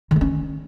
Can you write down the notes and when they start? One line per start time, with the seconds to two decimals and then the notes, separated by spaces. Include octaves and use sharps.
0.11 D#3
0.16 A3
0.21 C#4